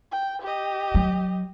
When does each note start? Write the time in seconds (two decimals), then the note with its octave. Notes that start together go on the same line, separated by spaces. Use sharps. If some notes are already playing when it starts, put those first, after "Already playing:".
0.11 G5
0.42 G4 D#5
0.95 F#3